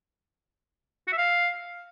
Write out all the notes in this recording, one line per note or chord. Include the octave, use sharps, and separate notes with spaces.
F#4
E5
F5